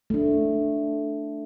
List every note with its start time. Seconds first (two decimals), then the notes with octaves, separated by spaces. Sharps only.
0.10 A3 D4